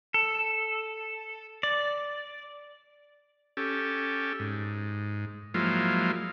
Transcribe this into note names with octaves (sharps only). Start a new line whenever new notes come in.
A4
D5
C#4 G4 A4
G#2
F3 F#3 G#3 A#3 E4 F4